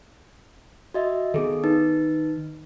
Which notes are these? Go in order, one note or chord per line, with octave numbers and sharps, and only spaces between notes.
F#4 D#5 E5
D#3 B3 G#4 A4
D#4 B4